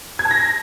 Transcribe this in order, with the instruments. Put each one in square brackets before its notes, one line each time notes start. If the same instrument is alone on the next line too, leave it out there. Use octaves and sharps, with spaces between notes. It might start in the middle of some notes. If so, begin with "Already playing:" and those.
[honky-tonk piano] G#6
A5
A#6